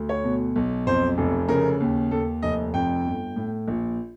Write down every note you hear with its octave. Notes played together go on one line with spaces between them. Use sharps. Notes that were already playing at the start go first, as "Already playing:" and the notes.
Already playing: D2
C#5
B2
B1
F2 C5
F1
C#3 A#4
D#2
D#2 A4
F1 D#5
F2 G5
G1
A2
A#1